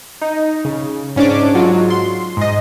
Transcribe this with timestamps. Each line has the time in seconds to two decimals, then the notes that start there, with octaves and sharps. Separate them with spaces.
0.22 D#4
0.65 C#3
1.16 G#2 C#4 D4 D6
1.54 G#2 F#3 F4
1.90 C6
2.37 G#2 D#5